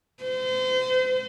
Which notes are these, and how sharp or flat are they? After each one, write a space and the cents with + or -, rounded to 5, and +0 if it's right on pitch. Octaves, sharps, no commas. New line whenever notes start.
C5 -35